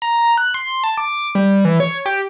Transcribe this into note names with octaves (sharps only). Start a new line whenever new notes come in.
A#5
F#6
C6
A5
D6
G3
E3
C#5
G4